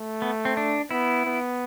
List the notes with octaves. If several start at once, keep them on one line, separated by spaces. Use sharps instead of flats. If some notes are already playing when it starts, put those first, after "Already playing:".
Already playing: A3
B3
C4
D4
B3 E4
B3